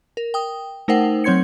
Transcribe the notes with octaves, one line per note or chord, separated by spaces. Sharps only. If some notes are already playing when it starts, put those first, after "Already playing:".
A#4
G5 D#6
A3 D#4 A#4 C5 F#5 G5
F#3 C4 C#5 C6 G#6 C#7